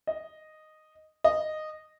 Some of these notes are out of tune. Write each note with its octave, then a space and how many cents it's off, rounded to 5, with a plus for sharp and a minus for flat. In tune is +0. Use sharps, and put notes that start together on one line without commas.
D#5 -5
D#5 -10